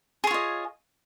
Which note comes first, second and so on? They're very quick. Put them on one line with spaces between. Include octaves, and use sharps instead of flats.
G#4 C#5 F4 D#5